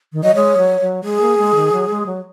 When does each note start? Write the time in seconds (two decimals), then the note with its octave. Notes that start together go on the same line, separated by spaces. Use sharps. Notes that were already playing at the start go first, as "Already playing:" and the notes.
0.13 D#3
0.24 F#3 D#5
0.35 G#3 C#5
0.58 F#3
0.81 F#3
1.04 G#3 G#4
1.21 A#3
1.38 G#3
1.55 D#3
1.72 F#3
1.89 G#3
2.06 F#3